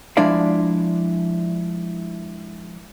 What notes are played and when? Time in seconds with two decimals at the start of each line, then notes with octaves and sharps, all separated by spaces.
0.17 F3 G#3 D4 E4 D5 F5